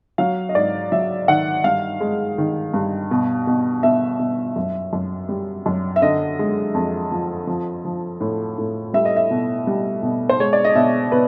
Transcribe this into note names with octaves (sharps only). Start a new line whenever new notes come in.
F#3 F5
D#5
G#2 D5
F#3 E5
D#3 F#5
G2 F5
G#3
D#3
G2
B2
B2
B2 E5
B2
F#2
F#2
G3
F#2
E5
D3 D#5
G#3
F2
F3
F3
F3
A2
A2
G3 E5
D#5
E5
B2
G3
B2
C5
G#3 C#5
D5
D#5
B2 E5
B2 B4